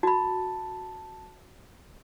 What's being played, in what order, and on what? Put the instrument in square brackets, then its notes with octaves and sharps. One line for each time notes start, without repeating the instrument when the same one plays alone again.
[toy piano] F#4 B5 [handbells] A5